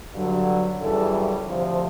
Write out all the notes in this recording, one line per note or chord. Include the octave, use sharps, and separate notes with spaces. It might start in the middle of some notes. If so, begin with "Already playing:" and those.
G2 D3 F#3
F#2 C#3 E3 G3 A4
D2 C3 F3